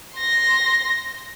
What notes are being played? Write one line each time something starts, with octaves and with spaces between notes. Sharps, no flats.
C6 A#6